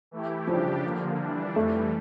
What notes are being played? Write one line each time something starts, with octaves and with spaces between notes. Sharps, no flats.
E3 A3 E4 G4
C#3 F3 G3 D4 G4
D3 F3 A#3
E3 G3 D4
F2 E3 G3 A3